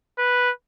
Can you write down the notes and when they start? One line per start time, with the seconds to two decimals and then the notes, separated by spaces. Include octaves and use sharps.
0.18 B4